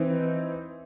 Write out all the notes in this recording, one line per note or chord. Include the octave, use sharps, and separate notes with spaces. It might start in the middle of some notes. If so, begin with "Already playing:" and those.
Already playing: E3 C4 D#4